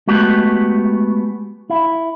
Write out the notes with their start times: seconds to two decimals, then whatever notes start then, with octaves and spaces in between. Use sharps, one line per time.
0.07 G#3 A3 B3 F#4 G4
1.70 E4